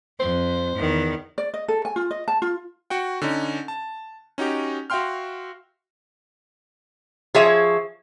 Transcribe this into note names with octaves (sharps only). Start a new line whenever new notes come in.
F2 C5
E2 D#3
D5
D#5
A4
G#5
F4
D#5
A5
F4
F#4 F#5 G5
D3 C#4 D#4
A5
C#4 D#4 F#4 G4
F#4 E5 F5 G5 C6 F6
F3 G#4 C#5 E5